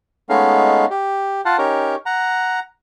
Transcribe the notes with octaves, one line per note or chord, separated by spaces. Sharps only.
G#3 A3 B3 C#4 D#4 F5
G4
F4 F5 F#5 A5
C#4 D#4 G4 A#4 C#5
F#5 A#5